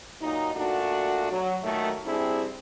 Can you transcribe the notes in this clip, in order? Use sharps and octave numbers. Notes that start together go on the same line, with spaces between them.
A#2 F#3 D#4
A#2 A3 D4 F#4
F#3
A#2 D#3 F#3 A3
G3 C4 D4 E4 G#4